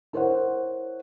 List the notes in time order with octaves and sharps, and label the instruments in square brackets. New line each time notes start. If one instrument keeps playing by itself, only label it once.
[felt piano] E4 A#4 C5 C#5 F#5